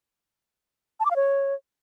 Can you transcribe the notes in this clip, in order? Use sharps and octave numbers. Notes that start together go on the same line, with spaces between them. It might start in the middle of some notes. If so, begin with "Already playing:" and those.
A5
D6
F5
C#5